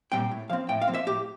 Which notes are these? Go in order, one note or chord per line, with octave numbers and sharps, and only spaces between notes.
A#2 G3 C4 G5
A2
F3 C4 F5
A2 G5
F5
F3 C4
E5
A2 G4